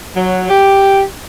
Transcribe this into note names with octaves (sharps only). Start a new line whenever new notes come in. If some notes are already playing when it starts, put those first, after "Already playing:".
F#3
G4